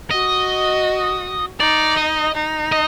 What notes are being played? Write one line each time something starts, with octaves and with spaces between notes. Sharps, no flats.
F#4 D#5
D#4 D5
D#5
D#4
D#5